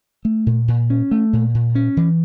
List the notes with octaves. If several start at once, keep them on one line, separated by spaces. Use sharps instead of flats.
A3
A#2
A#2
C#4
A3
A#2
A#2
C#4
E3